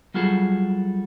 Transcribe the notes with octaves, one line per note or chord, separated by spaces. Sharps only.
F#3 G3 F4 F#4 G#4 A4